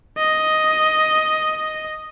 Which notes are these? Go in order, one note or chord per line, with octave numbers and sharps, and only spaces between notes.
D#5